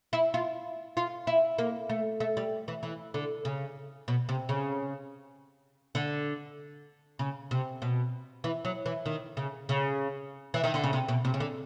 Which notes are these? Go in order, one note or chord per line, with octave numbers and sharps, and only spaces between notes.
E4
F4
F4
E4
A#3
A3
A3
G3
E3
E3
D3
C#3
B2
C3
C#3
D3
C#3
C3
B2
E3
F#3
E3
D#3
C#3
C#3
E3
D#3
D3
C#3
C3
B2
C3
C#3
D3